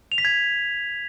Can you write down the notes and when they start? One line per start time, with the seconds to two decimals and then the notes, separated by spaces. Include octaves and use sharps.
0.12 F7
0.18 B6
0.25 G#6